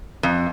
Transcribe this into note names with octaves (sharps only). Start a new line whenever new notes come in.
F2